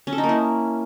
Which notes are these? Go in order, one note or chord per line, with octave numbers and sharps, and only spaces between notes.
C#4
A4
D#4
A#3
E4